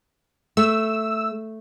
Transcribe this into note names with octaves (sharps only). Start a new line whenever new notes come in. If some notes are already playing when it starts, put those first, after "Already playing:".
A3 E6